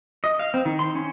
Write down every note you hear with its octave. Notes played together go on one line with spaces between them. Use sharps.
D#5
F5
C4
D#3
C6
C#4